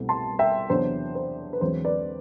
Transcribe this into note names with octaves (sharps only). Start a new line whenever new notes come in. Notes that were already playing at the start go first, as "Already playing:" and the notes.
Already playing: C2 B2 A3 C4 E4
A5 C6
E5 G5
E2 C3 F#3 B3 D4 C5
C5
B4
E1 E2 D3 F#3 C4 C5
B4 D5